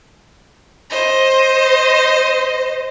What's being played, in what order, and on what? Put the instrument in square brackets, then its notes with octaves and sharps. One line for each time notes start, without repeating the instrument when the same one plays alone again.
[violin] C5 D#5